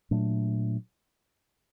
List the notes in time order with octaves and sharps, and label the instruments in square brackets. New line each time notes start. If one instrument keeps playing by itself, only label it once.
[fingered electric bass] A#2 F#3 A3 D4